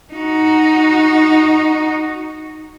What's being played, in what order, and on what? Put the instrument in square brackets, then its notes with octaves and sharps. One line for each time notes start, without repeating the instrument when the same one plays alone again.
[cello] D#4 F#4